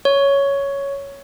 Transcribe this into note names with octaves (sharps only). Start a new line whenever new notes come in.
C#5